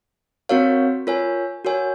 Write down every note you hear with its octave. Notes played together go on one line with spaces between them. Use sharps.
C4 F#4 A#4 C#5 F5
F4 A#4 C#5 G#5
F#4 A#4 C#5 G#5